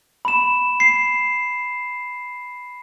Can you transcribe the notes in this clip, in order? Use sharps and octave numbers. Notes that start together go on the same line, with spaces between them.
B5 E7
C7